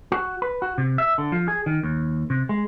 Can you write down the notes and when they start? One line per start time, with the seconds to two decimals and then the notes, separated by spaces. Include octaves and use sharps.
0.12 F#4
0.42 B4
0.62 F#4
0.78 C3
0.98 E5
1.18 D3
1.32 F3
1.48 G#4
1.66 D#3
1.83 D#2
2.30 C3
2.49 G#3